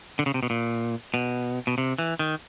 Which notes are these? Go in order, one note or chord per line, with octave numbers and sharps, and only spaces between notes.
D3
C#3
C3
B2
A#2
B2
B2
C3
E3
D#3